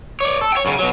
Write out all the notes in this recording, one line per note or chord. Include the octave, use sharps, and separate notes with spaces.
C#5 D5
A4
C#5 G5
F#2 C#3
B2 F#3